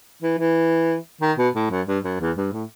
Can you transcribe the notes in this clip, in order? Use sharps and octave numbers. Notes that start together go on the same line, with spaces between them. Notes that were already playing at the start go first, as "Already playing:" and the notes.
E3
E3
D#3
B2
A2
F#2
G2
F#2
E2
G2
A2